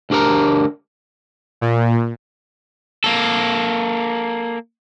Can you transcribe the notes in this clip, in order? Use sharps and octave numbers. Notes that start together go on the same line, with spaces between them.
D2 D4 G4 A#4 A#5
A#2
A#3 A4